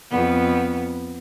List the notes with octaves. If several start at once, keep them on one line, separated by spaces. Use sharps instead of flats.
F2 B3